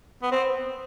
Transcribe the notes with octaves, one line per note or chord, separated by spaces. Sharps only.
B3
C4